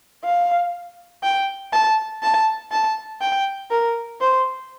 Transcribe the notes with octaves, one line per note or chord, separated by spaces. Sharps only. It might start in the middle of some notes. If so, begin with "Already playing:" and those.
F5
G5
A5
A5
A5
G5
A#4
C5